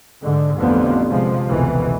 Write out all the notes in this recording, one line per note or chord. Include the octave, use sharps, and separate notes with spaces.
G#2 D3
A1 F2 D3 F3 B3
C3 F3 G#3
F1 C#2 B2 D#3 E3